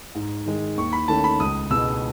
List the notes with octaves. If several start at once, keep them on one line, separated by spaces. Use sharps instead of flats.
G#2
D#3 G#3
D#2 C#6
B5
D#3 A3 C#4 A5
B5
C#2 D#6
B2 G#3 B3 E6